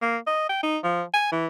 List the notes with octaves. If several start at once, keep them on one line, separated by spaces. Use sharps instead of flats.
A#3
D#5
G5
D#4
F3
G#5
E3